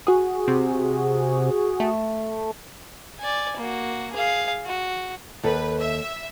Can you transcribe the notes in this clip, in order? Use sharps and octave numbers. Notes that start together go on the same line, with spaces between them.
F#4 G#4
C3
A3
D5 G#5
A#3 F#4
G#4 F5
F#4
D#2 A4 B4
E5